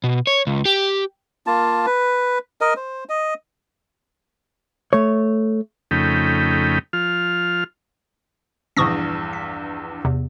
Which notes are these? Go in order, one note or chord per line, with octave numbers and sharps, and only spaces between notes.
B2
C#5
C#2
G4
A#3 F4 A5
B4
A#4 D#5
C5
D#5
A3 C#5
F2 C#3 A3 D#4 G5 B5
F3 F4 F6
A#1 E2 G2 C#6 D#6 A#6
B6
E2 C3